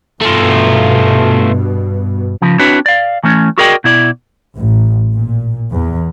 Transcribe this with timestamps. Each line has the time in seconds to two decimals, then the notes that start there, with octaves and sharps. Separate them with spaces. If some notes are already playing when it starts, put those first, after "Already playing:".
0.21 G2 B2 A3 F4
2.42 C#3 F3
2.59 C4 D4 E4 F#4 B4 C#5
2.86 D5 F5
3.24 E3 A3 C#4
3.58 F#4 G#4 A#4 D5 D#5 G5
3.84 B2 E4 D5
4.55 A1
5.12 A#2
5.71 E2